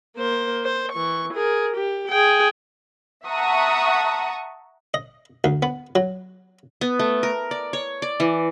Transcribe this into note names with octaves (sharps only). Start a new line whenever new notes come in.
A#3 C5
C5
E3 C#6
G#4 A#4
G4
G#4 G5
E5 F#5 A5 A#5 C#6 D#6
D#5
D2
B3
F#3
B3
A3
A#4
D5
C#5
D5
E3